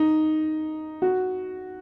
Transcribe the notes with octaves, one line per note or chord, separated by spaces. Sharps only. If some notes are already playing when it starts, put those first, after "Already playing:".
Already playing: D#4
F#4